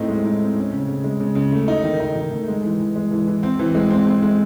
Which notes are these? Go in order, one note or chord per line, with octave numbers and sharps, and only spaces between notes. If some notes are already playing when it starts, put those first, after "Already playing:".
Already playing: A2 C4 D#4
G#3
D#4
C4
C#4
C#3
C#3
G#3
C#3
C#3
A3
D#4
D#3
D#4
D#3
A3
G#3
E3
E3
G#3
E3
E3
C4
E3
G#3
C4
C4
G#3